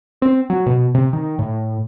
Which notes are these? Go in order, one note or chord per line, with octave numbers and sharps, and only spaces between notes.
C4
F#3
B2
C3
D#3
A2